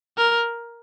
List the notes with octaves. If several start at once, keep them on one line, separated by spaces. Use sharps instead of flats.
A#4